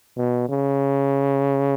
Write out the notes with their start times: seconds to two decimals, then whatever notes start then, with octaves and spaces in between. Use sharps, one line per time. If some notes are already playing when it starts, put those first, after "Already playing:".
0.17 B2
0.49 C#3